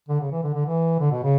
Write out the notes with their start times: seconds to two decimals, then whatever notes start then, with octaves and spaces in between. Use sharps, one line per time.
0.09 D3
0.20 C#3
0.31 E3
0.43 D3
0.54 D3
0.66 E3
1.00 D3
1.12 B2
1.23 C#3